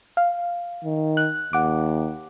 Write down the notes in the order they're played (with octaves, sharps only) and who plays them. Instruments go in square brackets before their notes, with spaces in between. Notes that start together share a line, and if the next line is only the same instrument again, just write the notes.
[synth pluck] F5
[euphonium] D#3
[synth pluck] F#6
[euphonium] D#2 [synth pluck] F#5 D6